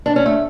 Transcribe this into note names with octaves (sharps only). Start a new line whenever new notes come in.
D4
C#4
A3